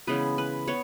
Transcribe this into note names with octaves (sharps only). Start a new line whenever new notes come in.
C#3 E3 G#3 B3 B4
B4
B3 C#5